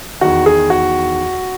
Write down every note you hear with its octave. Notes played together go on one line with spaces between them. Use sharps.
E2 D#3 F#4
G#4
F#4